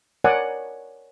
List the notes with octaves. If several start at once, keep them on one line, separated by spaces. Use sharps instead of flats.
A#4 C#5 D5 F#5 G#5